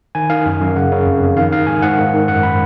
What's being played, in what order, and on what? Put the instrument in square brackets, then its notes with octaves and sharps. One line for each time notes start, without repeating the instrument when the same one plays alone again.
[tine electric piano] D#3 G#5
D#3 F5
F#2
F#2
C#3 F#5
C#3
F2
F2
D#3 F5
D#3 F5
G#2 G#5
G#2 F#5
D#3
D#3
F#2 F#5
B5